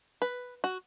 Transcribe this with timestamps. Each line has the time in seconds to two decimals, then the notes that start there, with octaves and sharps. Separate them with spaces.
0.22 B4
0.64 F#4